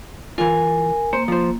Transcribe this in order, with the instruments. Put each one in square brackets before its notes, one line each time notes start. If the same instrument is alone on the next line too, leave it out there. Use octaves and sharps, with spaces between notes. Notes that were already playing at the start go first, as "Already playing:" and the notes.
[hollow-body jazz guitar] E3 F4 [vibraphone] A#4 G#5
[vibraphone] A#3 [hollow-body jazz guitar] C5
[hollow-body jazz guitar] F3 C5